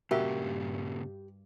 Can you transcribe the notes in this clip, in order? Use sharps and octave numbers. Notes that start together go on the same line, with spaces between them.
G2 A#2 C#3 F#4 G4 A#4 E5